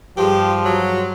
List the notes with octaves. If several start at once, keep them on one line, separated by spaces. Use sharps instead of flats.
G2 F3 G#3 G4
F#3